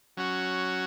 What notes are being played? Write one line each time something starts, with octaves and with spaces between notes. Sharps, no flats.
F#3 C#4 F#4